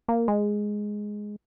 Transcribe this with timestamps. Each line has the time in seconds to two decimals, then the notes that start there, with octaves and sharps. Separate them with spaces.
0.08 A#3
0.28 G#3